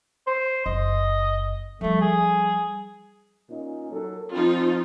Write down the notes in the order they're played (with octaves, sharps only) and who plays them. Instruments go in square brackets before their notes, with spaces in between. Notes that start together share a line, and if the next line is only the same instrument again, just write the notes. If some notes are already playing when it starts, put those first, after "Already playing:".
[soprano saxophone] C5
[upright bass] F#1 [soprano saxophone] D#5
[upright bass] F3 G3 [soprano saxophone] A3
[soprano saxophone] G#4
[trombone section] A#2 C#4 D#4
F#3 A4 A#4
[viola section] F3 D#4 F4 [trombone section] C4